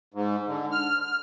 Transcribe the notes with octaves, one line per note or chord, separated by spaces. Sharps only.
G#2
D3
F6
F6